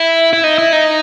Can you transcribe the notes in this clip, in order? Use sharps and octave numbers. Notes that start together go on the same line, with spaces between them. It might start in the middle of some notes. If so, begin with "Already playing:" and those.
Already playing: E4
E4
D#4
E4
D#4